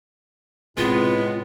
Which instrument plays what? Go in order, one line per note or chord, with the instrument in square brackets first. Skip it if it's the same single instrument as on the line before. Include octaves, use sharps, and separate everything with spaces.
[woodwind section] A2 E4 [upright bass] C3 [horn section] G#3 B3 [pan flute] F4